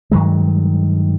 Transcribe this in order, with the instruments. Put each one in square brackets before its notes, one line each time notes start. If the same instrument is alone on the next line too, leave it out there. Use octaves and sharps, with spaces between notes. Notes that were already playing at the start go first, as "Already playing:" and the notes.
[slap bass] G2 D#3 F#3 G#3